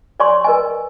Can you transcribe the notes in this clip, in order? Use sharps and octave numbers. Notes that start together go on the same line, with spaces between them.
C#5 D5 G#5 C6 C#6
A#4 B4 D#5 G#5